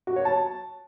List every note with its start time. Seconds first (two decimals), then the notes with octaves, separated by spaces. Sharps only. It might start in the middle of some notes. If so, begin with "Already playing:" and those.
0.07 F#4
0.16 C#5
0.25 A5